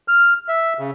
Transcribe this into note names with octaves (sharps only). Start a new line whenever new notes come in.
F6
E5
C#3